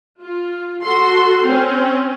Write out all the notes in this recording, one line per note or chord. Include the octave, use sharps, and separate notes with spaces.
F4
F#4 A4 C6
C4 C#4